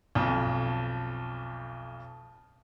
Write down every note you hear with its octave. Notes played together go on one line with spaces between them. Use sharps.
B1 F2